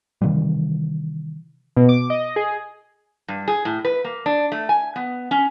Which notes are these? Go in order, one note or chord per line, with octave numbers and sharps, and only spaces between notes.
C3 D#3 E3 G3
B2
D6
D#5
G#4
G2
G#4
A2
B4
A#3
D4
A3
G#5
B3
C#4